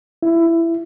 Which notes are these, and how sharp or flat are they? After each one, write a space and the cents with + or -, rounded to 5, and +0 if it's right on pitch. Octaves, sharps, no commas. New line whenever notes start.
E4 +15